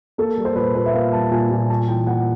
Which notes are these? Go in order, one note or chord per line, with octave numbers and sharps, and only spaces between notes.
A#3 A4
G3
C5
A#2 B4
A#2 B4
E5
A#3 F5
G3 A5
A#2 G#5
A#2
G3 A5
E3 G5
A#3 F#5